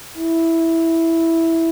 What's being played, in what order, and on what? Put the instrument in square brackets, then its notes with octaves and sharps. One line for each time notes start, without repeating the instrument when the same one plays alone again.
[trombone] E4